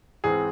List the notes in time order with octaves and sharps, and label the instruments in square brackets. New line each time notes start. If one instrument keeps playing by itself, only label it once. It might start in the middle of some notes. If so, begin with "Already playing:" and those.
[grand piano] G#2 E3 G#3 C4 G#4